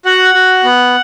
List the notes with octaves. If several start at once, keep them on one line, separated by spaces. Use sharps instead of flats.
F#4 F#5
F#4
B3